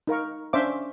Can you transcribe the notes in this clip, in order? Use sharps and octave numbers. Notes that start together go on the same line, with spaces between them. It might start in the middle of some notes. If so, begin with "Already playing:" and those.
D#4 A#4 F5 C#6
C#4 D4 C5 E5 F5 D6